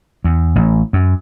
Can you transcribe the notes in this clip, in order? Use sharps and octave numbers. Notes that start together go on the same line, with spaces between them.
E2
A1
F#2